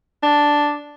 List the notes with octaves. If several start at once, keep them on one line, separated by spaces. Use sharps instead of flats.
D4